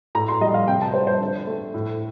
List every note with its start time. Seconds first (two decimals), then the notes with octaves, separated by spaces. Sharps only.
0.15 A2 A#5
0.28 C6
0.41 G3 D#5
0.54 F5
0.68 C3 G5
0.82 A5
0.94 G3 C5
1.07 C5
1.20 D3
1.47 A3
1.74 A2